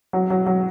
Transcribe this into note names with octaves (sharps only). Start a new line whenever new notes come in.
F#3
F#3
F#3